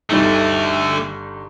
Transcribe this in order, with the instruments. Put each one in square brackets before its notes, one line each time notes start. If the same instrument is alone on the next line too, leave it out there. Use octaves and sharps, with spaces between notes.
[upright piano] G1 G3 D#4 [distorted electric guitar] D3 A3